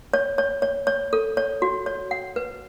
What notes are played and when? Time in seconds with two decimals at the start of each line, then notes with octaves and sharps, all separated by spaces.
0.14 C#5
0.38 C#5
0.62 C#5
0.87 C#5
1.13 A4
1.37 C#5
1.62 F#4
1.86 C#5
2.11 F#5
2.36 B4